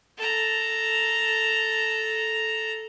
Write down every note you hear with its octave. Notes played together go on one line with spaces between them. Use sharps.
A4 A#5